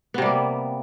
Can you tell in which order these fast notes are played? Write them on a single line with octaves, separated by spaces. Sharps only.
B3 C3 G3 A#3